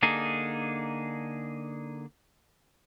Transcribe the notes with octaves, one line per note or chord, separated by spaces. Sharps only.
D3 A#3 D4 D#4 G#4